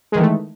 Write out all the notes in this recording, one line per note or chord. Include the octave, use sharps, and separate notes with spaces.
D#3 E3 G#3 A3